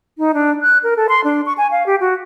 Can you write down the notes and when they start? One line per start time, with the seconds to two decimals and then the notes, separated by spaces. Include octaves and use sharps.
0.18 D#4
0.34 D4
0.62 F#6
0.83 A#4
0.97 A4
1.09 C6
1.24 D4
1.46 C#6
1.58 G#5
1.71 F5
1.86 G4
2.00 F#4